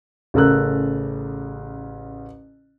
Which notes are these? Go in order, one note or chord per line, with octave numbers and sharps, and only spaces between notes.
A1 C#3 A4 A#4 E6 F#6